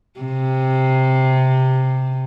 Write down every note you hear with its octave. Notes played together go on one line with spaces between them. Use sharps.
C3